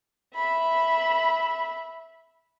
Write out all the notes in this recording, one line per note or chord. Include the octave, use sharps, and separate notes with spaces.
E5 B5